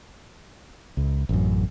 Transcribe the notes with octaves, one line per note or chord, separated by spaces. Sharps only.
C#2
A1 F#2